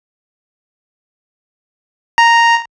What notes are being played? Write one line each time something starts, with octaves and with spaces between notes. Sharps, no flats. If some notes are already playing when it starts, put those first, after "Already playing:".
A#5